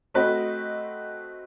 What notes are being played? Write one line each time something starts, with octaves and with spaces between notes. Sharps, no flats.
A3 C4 F#4 B4 D#5